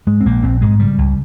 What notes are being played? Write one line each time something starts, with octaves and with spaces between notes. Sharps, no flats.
G#2 G#3
C4
A#1 A#3
A#1 C4
G#2 G#3
C#3 G3
C#2